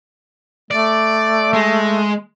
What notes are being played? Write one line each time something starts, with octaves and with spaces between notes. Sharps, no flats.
A3 D5
G#3